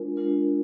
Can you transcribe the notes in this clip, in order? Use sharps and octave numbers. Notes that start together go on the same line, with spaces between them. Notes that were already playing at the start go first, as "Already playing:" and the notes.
Already playing: G#3 D4 F4 A#4
G#3 D4 F4 A#4